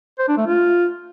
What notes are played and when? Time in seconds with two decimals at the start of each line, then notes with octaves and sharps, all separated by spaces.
0.19 C5
0.28 D4
0.37 A3
0.47 F4